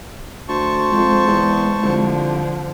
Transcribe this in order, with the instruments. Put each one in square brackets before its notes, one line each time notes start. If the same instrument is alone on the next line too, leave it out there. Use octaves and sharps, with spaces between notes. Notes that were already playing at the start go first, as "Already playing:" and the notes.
[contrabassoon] D2 [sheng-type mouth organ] C5 A5 C#6
[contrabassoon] F2 [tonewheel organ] G#3
[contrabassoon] E2
[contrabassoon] C2 [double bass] D3 F3